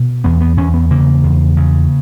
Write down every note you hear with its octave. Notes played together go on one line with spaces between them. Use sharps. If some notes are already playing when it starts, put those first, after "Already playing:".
Already playing: B2
E2 B3
B3
E2 C#4
B3
C#3 A#3
E2
C#3